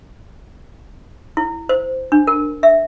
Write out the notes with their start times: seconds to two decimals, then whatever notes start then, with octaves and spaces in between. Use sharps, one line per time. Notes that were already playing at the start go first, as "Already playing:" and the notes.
1.37 E4
1.69 C5
2.12 D4
2.27 A#4
2.63 E5